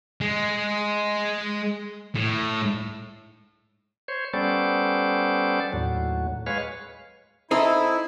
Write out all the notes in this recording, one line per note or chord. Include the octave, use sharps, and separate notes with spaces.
G#3
A2
C5 C#5
G3 B3 C#4 A4 C5 D5
D#2 A2 F#3
G#3 B4 C#5 F5
C4 D#4 E4 A4